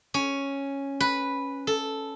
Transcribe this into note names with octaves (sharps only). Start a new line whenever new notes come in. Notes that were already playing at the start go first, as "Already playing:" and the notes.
C#4
B4
A4